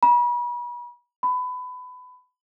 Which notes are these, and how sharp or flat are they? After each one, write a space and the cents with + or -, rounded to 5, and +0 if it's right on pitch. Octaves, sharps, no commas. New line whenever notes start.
B5 -35
B5 +25